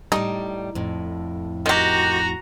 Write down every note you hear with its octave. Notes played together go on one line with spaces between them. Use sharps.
A2 G3 D#4
F2 A2
D#3 F#4 G4 A#5